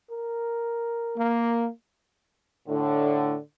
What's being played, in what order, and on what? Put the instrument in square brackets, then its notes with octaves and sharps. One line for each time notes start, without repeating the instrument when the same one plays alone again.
[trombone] A#4
[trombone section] A#3
[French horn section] A2 D3